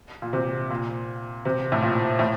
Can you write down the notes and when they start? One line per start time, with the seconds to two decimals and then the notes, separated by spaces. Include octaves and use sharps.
0.22 A#2
0.33 C3
0.70 A#2
1.45 C3
1.72 A2
1.82 A#2
2.19 A2